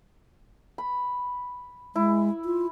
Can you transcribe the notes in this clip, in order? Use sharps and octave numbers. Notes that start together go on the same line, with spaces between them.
B5
G#3 E4
F4